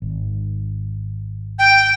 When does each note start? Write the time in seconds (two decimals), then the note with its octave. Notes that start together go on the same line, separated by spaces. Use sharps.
0.02 G#1
1.59 G5